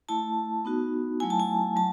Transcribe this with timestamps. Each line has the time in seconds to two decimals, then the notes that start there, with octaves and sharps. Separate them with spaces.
0.09 A3 E4 A5
0.65 B3 D#4 F#4
1.20 F#3 A3 E4 G#5
1.30 A5
1.40 G#5
1.76 F#3 A5